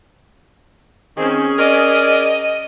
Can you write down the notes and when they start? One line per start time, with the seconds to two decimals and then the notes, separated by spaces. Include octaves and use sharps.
1.17 D#3 C4 C#4 G#4
1.59 A#4 D5 D#5